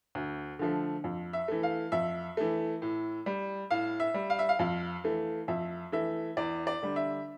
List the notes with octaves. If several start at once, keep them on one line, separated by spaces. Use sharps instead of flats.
D2
D3 F3 A3
F2
E5
E3 A3
F5
F2 E5
E3 A3
A2
G3
A2 F5
E5
G3
F5
E5
F5
F2 F5
E3 A3
F2 E5
E3 A3 E5
E2 D5
D5
D3 G3
E5